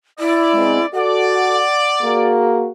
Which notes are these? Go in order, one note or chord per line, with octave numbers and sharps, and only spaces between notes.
E4 D5
G#3 B3 C4
F#4 A4 D5 F#5
A#3 F#4 G#4